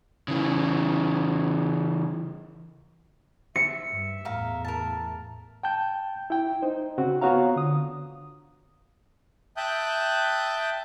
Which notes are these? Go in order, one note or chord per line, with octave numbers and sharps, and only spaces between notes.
C#3 E3
E5 C#7
G2
E2 A2 A#4 F5 A#5
A#4 A5
G5 A5 G6
E4 G5
D#4 C5
C#3 C4 F#4
B3 F4 F#4 C#5 F5 A#5
D3 D#6
E5 G5 A5 D#6 F#6 G6